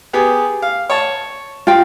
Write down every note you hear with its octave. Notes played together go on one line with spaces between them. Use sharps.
B3 G4 G#4
F5
C#5 A5
F4 F5 G5